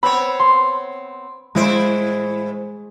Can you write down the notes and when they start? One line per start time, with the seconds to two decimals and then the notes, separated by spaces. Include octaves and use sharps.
0.03 B3 C4 C#5 B5 E6
0.40 C6
1.55 A2 G#3 E4 C5 D7